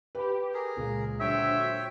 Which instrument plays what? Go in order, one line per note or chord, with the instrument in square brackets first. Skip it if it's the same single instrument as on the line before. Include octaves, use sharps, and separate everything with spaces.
[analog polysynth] G4 [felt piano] B4 B5
[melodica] G#4 A#4
[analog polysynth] C#2 C#3 [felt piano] A#2 G#3
[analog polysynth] D3 F#3 C5 [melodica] C#5 G5 [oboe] E5